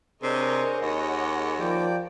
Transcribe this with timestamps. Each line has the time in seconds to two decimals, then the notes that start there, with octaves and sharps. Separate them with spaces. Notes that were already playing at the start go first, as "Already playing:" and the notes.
0.23 C3 D4 G#4 A#4 C5 C#5 D#5
0.82 D#2 C#5 D#5 F#5 A#5
1.59 F3 D5 G5